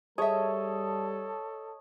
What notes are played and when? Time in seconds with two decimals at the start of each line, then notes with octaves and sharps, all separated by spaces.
0.18 G3 G#4 A4 C#5 D#5 E5 A5